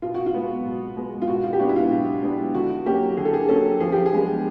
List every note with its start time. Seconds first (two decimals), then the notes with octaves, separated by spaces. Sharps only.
0.02 B2 F4
0.14 F#4
0.26 F4
0.34 G#3 B3
0.66 B2
0.97 G#3 B3
1.22 F4
1.28 B2 F#4
1.43 F4
1.53 G4
1.60 G#3 B3 D4 F#4
1.69 E4
1.76 F4
1.91 B2
2.23 G#3 B3 D4
2.54 D3 F#4
2.86 F#3 A#3 C#4 G4
3.17 D3 G#4
3.25 A4
3.34 G#4
3.48 F#3 A#3 C#4 A4
3.80 F3 G#4
3.92 G4
4.06 G#4
4.12 G#3 B3 D4